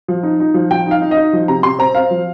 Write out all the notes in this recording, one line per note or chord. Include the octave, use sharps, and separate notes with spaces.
F3
D#4
D#4
F3
F3 G5
D#4 F5
D#4
D#5
D#4
F3
C3 A#5
C3 C6
C4 A#5
C4 F5
F3